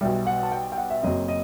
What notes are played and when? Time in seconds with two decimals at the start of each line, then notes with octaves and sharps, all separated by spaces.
0.01 B1 B2 G3 E5
0.27 F#5
0.43 A5
0.52 G5
0.72 G5
0.78 F#5
0.90 E5
1.03 F#1 F#2 F#3 C4 D#5
1.28 D#5